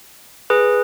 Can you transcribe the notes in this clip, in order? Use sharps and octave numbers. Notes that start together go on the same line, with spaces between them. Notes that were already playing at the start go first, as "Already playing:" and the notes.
G#4 B4